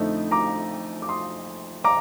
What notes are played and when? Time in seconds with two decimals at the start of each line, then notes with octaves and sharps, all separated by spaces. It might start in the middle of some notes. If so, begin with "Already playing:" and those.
Already playing: F2 D3 A3 D#4
0.31 A#5 D6
1.02 D6
1.09 C6 D#6
1.84 A#5 D6